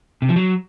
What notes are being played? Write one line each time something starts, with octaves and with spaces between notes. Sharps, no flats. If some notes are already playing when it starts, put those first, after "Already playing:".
C3
F3
F#3